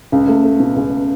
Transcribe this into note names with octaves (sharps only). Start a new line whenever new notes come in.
C#2
A3
A3
B2
C#2